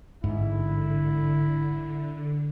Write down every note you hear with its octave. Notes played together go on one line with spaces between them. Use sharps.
A1 G#2 D3 E4